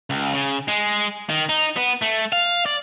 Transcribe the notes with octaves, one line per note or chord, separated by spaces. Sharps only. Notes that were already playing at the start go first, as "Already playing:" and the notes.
C#2
C#3
G#3
D#3
D#4
B3
A3
F5
D5